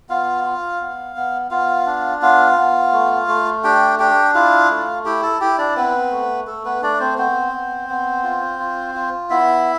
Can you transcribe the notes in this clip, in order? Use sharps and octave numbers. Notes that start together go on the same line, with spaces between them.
B3 F4 F5
F4
B3
B3
B3 F4 F5
D4
B3 F4 F5
B3
A3
A3
D4 G4 G5
D4 G4 G5
E4 F4 F5
A3
E4 G4 G5
A4 A5
E4 G4 G5
D4 D5
B3 C4 B4
A3
A3 A4
B3 B4
A3 D4 D5
C4 C5
B3 C4 C5
B3
B3
F4
F4
F4
B3 E4 E5